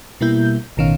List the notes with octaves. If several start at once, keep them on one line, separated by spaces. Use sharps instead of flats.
B2 G3 A#3 E4 G6
A1 B2 D#3 C#4 F5